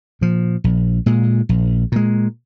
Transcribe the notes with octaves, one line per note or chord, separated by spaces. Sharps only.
A#2 F3
A#1
A#2 G#3
A#1
A#2 G#3